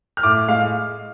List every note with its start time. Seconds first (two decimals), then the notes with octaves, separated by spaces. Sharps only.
0.17 F6
0.23 A2 D6
0.48 G#3 F5